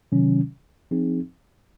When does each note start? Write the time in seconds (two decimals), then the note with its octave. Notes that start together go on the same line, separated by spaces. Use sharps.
0.12 C3 D#3 F#3 C#4
0.91 F3 C4 D#4 G#4